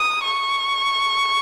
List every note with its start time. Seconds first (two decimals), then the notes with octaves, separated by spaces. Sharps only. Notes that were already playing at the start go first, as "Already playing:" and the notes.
Already playing: D#6
0.24 C#6